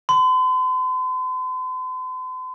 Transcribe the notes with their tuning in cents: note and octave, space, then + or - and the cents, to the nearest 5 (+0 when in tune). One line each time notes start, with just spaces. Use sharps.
C6 -45